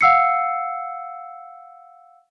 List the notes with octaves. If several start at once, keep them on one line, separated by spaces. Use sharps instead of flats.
F5 F#5 E6 C7 C#7